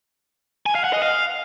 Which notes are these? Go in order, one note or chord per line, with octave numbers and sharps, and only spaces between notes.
G#5
F5
F#5
D#5
F5